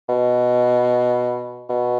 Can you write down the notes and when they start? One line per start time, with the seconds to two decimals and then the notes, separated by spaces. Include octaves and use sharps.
0.09 B2
1.69 B2